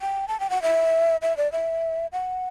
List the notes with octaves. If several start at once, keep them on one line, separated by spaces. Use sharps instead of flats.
G5
A5
G5
F#5
E5
E5
D5
E5
F#5